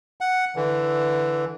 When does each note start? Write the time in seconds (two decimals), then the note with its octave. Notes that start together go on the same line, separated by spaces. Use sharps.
0.21 F#5
0.56 D3 E3